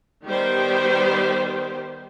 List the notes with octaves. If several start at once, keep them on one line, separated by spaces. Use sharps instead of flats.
D#3 G3 B3 G4 C5